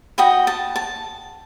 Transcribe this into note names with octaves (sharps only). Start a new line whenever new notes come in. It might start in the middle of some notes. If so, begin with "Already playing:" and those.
F#4 B4 D#5 G5
A5
A5